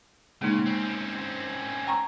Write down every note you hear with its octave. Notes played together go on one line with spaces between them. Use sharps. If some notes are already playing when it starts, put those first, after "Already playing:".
C#3 G#3 A#3 D#4
C4 C#4
G5 A#5 C#6